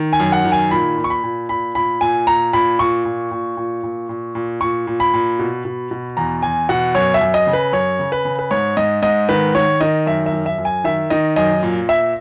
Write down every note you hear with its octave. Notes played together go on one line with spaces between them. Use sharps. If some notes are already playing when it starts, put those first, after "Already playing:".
Already playing: D#3
G#5
F#2
F#5
D#3
G#5
A#2 B5
A#2
C#6
B5
A#2
A#2 B5
A#2 B5
A#2 G#5
A#2 A#5
A#2 B5
A#2 C#6
A#2
A#2
A#2
A#2
A#2
A#2
A#2 C#6
A#2
B5
A#2
B2
B2
B2
E2 A#5
E2 G#5
B2 F#5
F#2 C#5
E5
F#2
D#5
C#3
B4
F#2 C#5
C#3
B4
C#3
B4
G#2 C#5
G#2 D#5
G#2 D#5
D#3 B4
D#3 C#5
D#3 D#5
F#2 E5
E5
F#2
E5
F#2
G#5
D#3 E5
D#3 D#5
F#2 D#5
A#2
A#2 E5